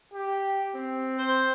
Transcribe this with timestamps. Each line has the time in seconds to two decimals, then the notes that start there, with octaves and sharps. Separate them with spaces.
0.14 G4
0.76 C4
1.19 C5